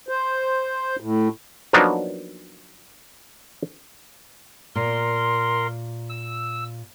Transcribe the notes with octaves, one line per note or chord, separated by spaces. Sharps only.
C5
A2
F3 F#3 A#3 B3 D4 D#4
A#2 A#4 C6
E6